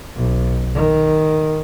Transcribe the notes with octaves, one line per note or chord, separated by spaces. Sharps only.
B1
D#3